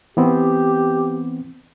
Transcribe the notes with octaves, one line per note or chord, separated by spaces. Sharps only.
E3 B3 C4 G4